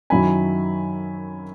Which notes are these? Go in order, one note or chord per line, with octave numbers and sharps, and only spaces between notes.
F#2 D#3 F#3 C#4 E4 G#5 B5